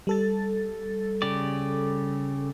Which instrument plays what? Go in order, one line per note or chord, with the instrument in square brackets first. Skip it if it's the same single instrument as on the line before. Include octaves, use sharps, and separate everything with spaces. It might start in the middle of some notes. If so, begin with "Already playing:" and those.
[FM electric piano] G3 A4 A6
[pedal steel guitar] C#3 G4 D5